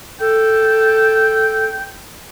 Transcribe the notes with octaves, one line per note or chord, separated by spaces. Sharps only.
A4 G5